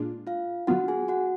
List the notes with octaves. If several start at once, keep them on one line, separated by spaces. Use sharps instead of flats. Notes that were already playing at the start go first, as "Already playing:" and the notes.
Already playing: A#2 G#3 D4 F4
F4 F5
D3 F#3 B3 F4 F#4 F#5
G#4 G#5
F#4 F#5